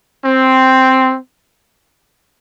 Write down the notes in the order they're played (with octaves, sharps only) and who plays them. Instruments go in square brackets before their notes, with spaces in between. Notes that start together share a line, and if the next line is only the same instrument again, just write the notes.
[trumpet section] C4